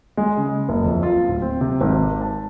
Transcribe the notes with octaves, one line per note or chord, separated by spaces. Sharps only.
G#3
C#3
F#1
F2
F4
D1
C4
C3
G#1
A5